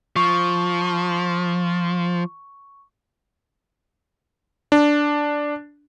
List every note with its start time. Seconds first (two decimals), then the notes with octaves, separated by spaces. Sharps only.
0.16 F3 C#6
4.72 D4